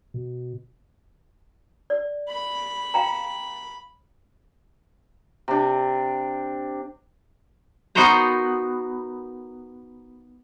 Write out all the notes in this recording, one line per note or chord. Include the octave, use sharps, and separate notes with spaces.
B2
D5
B5
F5 G5 A#5
C3 D4
B3 D#4 F#4 A#4 C5 A#5